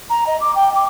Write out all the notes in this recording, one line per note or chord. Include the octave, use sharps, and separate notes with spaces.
A#5
D#5
D6
G5
D6